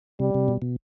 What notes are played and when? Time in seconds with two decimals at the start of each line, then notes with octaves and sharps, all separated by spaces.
0.20 C3 G3
0.34 C3
0.48 B2
0.62 B2